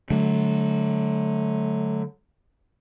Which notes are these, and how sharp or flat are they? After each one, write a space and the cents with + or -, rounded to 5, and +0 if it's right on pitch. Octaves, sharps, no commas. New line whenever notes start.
D3 +0 F#3 +0 A3 -30